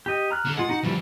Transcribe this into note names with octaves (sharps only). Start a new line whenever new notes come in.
G4 D#5
A#5 F6 F#6
D3 A4
G#3 F4 F#5
D#4 F#4
D3 E3 F3 G3 F4